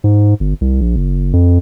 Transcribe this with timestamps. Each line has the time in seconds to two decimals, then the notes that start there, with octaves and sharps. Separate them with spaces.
0.04 G#2
0.40 G1
0.61 C2
0.81 A#1
0.96 F#1
1.33 F2